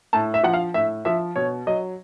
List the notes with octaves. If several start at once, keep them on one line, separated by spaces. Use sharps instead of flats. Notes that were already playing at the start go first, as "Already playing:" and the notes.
A2 A5
E5
F3 F#5
F5
A2 E5
F3 E5
B2 C#5
F#3 D#5